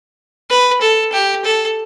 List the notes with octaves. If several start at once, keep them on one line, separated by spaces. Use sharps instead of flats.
B4
A4
G4
A4